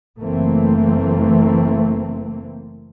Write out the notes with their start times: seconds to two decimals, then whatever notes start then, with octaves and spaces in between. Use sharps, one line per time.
0.20 F#1 E3 A3 A#3 C4